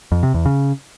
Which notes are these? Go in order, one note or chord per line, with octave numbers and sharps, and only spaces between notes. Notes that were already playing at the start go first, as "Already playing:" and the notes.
F2
C3
E2
C#3